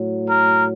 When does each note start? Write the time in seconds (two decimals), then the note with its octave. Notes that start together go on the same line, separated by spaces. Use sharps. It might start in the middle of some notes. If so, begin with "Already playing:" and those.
Already playing: A2 F#3
0.28 A#4